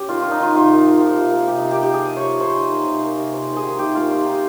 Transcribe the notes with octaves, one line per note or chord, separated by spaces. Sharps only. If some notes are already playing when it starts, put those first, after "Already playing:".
Already playing: C#4 G4
D#3 F4
D#3 F4
D#4
D#3 F4
C3 F4
A#3
F3
F3
C3
A#3
C3 G4
C3 D#4
G4
A#3
G4
F3 G#4
C3
C#5
F3
D#3 C5
D#4
A#3
C3
A#3
C3
C3 C5
D#3
G#4
D#3
C3 G4
A#3 F4
D#4 F4
D#4 G4